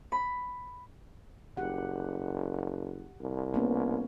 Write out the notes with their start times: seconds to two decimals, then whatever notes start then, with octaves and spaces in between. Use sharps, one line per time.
0.12 B5
1.57 F#1 G4 F#5
3.20 C2
3.54 A#3 B3 C#4